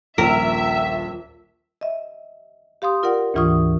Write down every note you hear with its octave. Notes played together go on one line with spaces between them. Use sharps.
D#1 A#1 A#4 E5
D#5 E5
G4 F5 C6 D#6
F4 A#4 D5 F#5
D2 G#2 E3 F4 C#6 D#6